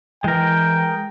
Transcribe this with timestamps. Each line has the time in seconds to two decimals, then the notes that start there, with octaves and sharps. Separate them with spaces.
0.24 E3 G#3 A#4 G5